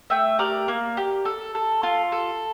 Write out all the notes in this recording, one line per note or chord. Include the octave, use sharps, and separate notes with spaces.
A3 E5 G5
G4 A#4 D5
A#3
G4
A4
A4
F4
A4